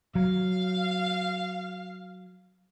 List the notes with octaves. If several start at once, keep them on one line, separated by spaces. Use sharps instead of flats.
F#3 F5